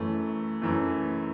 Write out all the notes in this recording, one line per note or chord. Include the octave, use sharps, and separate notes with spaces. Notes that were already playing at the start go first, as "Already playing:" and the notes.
Already playing: F#2 E3 A3
F#2 E3 A3